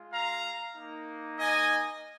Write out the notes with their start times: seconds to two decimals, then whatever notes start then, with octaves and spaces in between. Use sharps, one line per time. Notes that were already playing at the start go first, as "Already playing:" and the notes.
Already playing: G#3 F4
0.12 F5 A#5
0.76 A#3 D#4
1.39 D#5 G#5